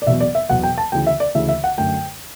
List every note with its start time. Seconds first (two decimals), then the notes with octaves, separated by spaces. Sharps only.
0.02 D5
0.06 E1 E2 B2 F#3 E5
0.20 D5
0.35 E5
0.49 E1 E2 B2 F#3 F#5
0.63 G5
0.78 A5
0.92 D2 C#3 E3 G5
1.07 E5
1.20 D5
1.35 D2 C#3 E3 E5
1.49 E5
1.64 F#5
1.78 F#2 D3 A3 G5